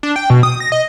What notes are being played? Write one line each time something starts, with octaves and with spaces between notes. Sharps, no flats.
D4
G5
B2
D#6
A#6
D#5